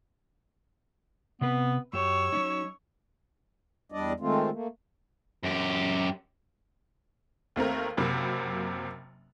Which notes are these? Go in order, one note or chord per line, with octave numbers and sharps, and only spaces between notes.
C3 B3 C4 B4
F#2 G4 C#5 E6
F#3 C#4 D#4
E2 G3 D4 D5 D#5
D#3 G#3 A3 C4 F4
A3 A#3
F#2 G4
D#2 A3 C4 A#4
F#1 C3 F#3 A#3 B5